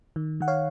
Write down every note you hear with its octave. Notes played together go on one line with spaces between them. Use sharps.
D#3
D#3 F#5
C#5 F5